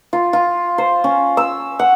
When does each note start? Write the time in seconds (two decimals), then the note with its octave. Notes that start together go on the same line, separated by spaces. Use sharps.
0.13 F4
0.33 F4
0.78 C5
1.04 C#4
1.37 E6
1.79 F#5